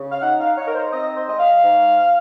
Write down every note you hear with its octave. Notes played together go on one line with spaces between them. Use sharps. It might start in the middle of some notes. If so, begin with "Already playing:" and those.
Already playing: C#3
F5
D#4 F#5
F5
D#4 C#5
A#4
C5
C4 D#5
C5
G#3 D#5
F5
G#2